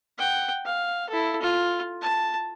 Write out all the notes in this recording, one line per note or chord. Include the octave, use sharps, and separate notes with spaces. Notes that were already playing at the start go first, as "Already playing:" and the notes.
F#5 G5
F5
E4 A4
F4
A5